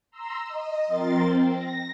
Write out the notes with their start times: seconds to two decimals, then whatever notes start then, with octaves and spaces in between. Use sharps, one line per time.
0.11 A#5 C6 E6
0.47 D#5
0.87 F3 C4 A#4 C6 A6
1.23 C4
1.54 A#6